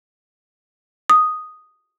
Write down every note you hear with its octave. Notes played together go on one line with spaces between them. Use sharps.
D#6